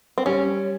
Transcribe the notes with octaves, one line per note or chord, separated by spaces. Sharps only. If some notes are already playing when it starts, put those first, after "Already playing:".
C4
G3 C#4